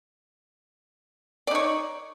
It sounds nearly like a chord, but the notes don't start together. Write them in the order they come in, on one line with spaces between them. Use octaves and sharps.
D5 D#4 C#5